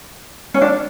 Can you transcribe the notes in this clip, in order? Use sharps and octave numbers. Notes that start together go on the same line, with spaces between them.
C#4
D4